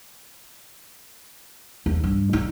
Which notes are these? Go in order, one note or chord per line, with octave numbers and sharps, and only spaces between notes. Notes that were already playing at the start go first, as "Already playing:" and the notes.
D#2
G2
D#4